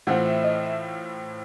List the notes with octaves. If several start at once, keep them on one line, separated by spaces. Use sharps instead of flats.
A2 E3 A3 C4 F4 F#5
E5
D#5
E5